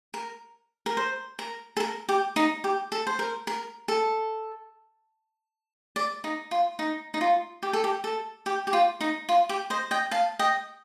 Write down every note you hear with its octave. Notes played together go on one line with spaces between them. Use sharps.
A#4
A#4
C5
A#4
A4
A#4
G4
D#4
G4
A4
C5
A#4
A#4
A4
D5
D#4
F4
D#4
D#4
F4
G4
A4
G4
A4
G4
G4
F4
D#4
F4
G4
C5 D#5
D#5 G5
F5 A5
D#5 G5